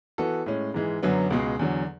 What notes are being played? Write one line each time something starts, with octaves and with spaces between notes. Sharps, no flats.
E3 B3 F#4 A4
A2 G#3 C#4
G#2 E3 G#3
F#2 D3 F#3 B3
C#2 B2 G#3
E2 D3 F#3